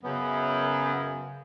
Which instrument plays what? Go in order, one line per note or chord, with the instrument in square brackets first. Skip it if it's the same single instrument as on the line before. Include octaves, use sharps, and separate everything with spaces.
[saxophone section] F#2 [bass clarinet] C#3 [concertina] B3